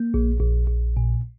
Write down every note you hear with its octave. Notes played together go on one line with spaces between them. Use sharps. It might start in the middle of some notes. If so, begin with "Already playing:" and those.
Already playing: A#3
A#1
A#1
A#1
A#2